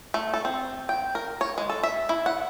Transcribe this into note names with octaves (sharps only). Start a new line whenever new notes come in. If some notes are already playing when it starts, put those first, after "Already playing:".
A3
A4
C4
G5
A#4
C#5
G#3
A4
E5
E4
F#5